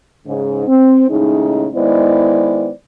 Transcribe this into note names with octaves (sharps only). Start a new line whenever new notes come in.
G#2 C#3
C4
D#2 A2 C#3 G#3 D#4
D#3 G#3 B3 E4 C5 D5